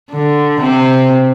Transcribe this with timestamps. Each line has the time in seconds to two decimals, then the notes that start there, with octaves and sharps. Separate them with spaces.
0.11 D3
0.60 C3 C4